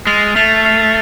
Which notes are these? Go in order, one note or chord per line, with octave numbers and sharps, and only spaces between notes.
G#3 F6 A6 C7 F7
A3 F6 A6 C7 F7
F6 A6 C7 F7